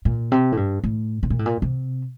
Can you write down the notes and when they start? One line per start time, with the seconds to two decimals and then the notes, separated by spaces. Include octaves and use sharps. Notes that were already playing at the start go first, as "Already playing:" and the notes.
0.05 A#2
0.32 C3
0.52 A2
0.57 G2
0.84 A2
1.23 C3
1.30 A#2
1.39 A2
1.46 A#2
1.62 C3